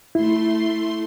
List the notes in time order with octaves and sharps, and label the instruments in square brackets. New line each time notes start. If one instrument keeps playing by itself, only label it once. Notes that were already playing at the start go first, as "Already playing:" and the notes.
[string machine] A3 C6 [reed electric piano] E4